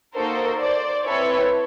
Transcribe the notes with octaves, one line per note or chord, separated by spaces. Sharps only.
A#3 D#4 F#4 A4 A#4 C5
C5 D5
C4 E4 A4 B4 C#5